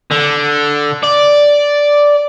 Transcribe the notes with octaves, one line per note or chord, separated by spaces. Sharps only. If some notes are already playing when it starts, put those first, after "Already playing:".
D3
D5